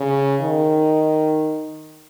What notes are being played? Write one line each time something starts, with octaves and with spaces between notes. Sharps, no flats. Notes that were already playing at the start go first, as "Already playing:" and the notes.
Already playing: C#3
D#3